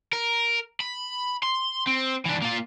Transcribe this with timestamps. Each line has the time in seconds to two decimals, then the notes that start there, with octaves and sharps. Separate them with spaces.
0.13 A#4
0.80 B5
1.43 C6
1.87 C4
2.25 E3 D4
2.42 A#3 F4